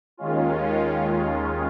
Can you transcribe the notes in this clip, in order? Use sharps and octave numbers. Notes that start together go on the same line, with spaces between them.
D#2 D#3 G#3 C#4 F4